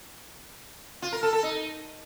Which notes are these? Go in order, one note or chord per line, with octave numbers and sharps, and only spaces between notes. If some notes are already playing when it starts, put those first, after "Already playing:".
F4
A#4
A4
A4
D#4